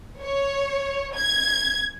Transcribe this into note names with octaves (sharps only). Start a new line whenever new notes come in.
C#5
G#6